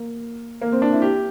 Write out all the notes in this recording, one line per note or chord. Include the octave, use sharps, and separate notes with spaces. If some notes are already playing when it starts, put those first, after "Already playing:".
Already playing: A#3
A#3
C4
D4
E4
G4